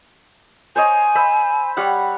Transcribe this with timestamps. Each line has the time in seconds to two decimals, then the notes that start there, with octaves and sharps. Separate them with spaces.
0.76 C5 C#5 D#5 G#5
1.15 C5 B5 E6
1.77 G3 C#5 F#5